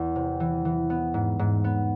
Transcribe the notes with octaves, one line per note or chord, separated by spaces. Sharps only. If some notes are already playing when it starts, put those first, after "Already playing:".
Already playing: E2
C3
E3
E3
B3
G#2
G#2
B3